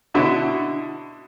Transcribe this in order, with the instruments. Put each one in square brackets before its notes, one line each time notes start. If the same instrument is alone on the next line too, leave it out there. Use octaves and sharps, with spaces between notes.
[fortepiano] B2 D3 E4